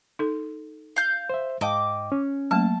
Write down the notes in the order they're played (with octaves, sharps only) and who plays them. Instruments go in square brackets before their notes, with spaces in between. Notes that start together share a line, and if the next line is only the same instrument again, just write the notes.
[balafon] D#4 A4
[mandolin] F5 G6
[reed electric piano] C5 E5
[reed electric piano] G#2 D#5 G5 [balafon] F5 A5 [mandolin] D6
[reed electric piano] C#4
[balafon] F#3 A3 A#3 [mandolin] A5